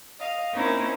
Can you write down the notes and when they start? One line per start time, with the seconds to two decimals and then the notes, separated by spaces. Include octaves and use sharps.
0.19 D#5 F5
0.52 A#3 C4 C#4 D#4 E4 A#4